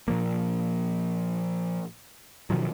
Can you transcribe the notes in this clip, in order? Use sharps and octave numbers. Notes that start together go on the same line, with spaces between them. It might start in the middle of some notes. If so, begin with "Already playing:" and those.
A#2 F3 A#3
B2 D#3 F3 F#3